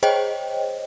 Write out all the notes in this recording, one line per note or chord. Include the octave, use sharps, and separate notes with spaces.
G#4 C5 C#5 D#5 G5